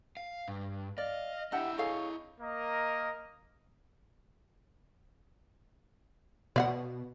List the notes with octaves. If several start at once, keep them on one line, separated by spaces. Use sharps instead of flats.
F5
G2
D5 D#5 F5
D4 E4 G4 D#5 E5 F#5
G#4 A4 C#5 F5
A#3 A#4 D#5
B2 D5 F5 F#5